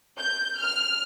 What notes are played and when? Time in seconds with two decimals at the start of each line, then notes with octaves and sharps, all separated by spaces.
0.18 G6
0.60 F6